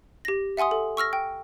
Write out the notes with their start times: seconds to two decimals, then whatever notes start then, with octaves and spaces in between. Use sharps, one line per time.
0.25 G4 A#6
0.57 E5 F#5 G#5 C6 D#6
0.71 A4
0.97 C#6 E6 F6 A#6
1.13 G5